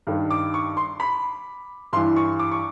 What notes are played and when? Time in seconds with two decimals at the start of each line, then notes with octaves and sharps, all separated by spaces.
0.07 G2 D#3
0.30 D6
0.54 C#6
0.77 C6
1.00 B5
1.93 G2 C6
1.96 E3
2.16 C#6
2.39 D6
2.52 C#6